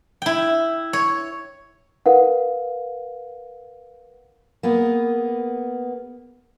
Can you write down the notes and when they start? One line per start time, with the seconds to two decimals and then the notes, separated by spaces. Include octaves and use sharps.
0.22 E4 G5
0.93 C#5
2.06 A#4 B4 F5 F#5
4.63 A#3 B3 G#4